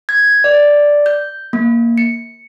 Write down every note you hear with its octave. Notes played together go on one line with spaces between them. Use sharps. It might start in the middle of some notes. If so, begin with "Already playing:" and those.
G#6
D5
G6
A#3
C#7